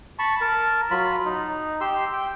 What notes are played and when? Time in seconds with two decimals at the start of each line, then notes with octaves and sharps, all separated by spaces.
0.19 A5 B5 C#6
0.41 A#4 A5
0.91 F#3 F4 B5
1.25 D#4
1.81 G4 C6 E6
2.13 G5